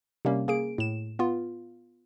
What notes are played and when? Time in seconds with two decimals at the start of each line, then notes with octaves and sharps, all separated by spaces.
0.25 C3 G3 A#3 C#4
0.48 A#3 G#4 D7
0.78 A2 E7
1.19 B3 F4